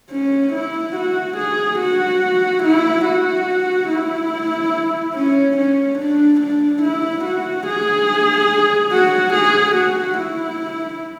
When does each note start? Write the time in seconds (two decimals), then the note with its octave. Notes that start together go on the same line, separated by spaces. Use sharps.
0.11 C#4
0.53 E4
0.96 F#4
1.37 G#4
1.79 F#4
2.63 E4
3.05 F#4
3.89 E4
5.14 C#4
5.57 C#4
5.98 D4
6.40 D4
6.82 E4
7.24 F#4
7.66 G#4
8.91 F#4
9.34 G#4
9.75 F#4
10.18 E4